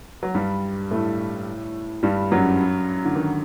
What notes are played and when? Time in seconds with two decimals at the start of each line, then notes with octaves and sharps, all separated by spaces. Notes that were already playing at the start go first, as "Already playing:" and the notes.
0.23 F#3
0.35 G2 G3
0.91 A2 A3
2.03 G2 G3
2.31 F#2 F#3
3.05 D3
3.15 D#3